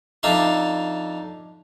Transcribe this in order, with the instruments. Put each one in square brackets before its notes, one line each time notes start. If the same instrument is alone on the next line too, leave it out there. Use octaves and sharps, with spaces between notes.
[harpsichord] F2 D4 D#4 E5 F5 C6